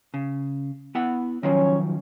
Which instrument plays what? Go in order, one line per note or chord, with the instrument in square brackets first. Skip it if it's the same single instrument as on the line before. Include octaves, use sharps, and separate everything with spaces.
[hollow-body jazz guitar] C#3
B3 E4 F#5
[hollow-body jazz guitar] D#3 F3 F#3 [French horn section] C#4 C#5